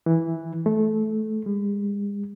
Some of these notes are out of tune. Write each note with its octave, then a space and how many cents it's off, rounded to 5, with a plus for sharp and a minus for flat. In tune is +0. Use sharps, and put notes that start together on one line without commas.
E3 -5
A3 -20
G#3 -45